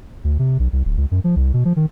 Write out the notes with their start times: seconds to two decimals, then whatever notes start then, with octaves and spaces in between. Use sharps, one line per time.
0.24 D2
0.39 C3
0.59 B1
0.73 C2
0.85 D1
0.97 C#2
1.11 F#2
1.24 F3
1.36 C2
1.54 B2
1.65 F3
1.76 D#3